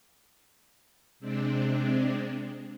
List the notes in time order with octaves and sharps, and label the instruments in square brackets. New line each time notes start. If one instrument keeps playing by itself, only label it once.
[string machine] C3 G#3 C4 D4